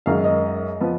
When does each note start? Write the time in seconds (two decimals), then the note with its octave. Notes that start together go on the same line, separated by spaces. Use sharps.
0.06 F#2 D#3 G#3 D#4 F5
0.24 D#5
0.80 F3 B3